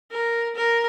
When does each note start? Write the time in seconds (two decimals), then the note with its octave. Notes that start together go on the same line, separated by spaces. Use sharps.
0.12 A#4
0.56 A#4